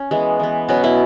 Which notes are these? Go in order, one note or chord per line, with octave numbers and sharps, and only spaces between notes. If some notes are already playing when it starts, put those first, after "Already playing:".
Already playing: C#4
E3 G#3 B3
E3 B3
B2 F#3 B3 C#4 F#4
B3 E4